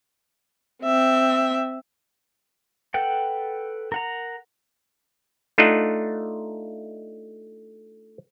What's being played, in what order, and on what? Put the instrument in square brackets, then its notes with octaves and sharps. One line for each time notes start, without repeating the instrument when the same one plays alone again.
[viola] C4 E5
[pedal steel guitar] A4 B4 F#5 G5
A#4 F#5 A#5
[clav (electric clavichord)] A3 D4 D#4 F4 D#5 F#5